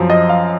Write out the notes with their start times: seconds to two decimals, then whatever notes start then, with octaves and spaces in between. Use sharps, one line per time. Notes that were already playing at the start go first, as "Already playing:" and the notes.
Already playing: F#2 F3
0.10 D#5
0.29 F5